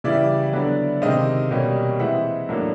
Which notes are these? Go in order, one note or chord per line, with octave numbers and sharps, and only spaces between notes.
C#3 E3 G3 D5 E5
D3 F#3 B3 D4
C3 D#3 G#3 C4 D#5 F5
B2 G3 A#3 C#4
E3 G#3 C4 E5 F#5
A2 F#3 A#3 D4